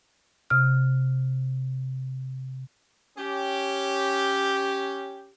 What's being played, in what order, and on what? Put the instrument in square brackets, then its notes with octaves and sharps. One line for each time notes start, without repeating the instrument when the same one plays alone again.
[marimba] C3 F6
[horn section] C#4 G4